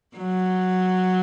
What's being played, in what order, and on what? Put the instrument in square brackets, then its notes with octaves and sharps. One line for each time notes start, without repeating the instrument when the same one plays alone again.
[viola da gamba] F#3